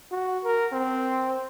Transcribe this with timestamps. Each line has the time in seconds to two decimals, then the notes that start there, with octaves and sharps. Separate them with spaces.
0.11 F#4
0.44 A#4
0.72 C4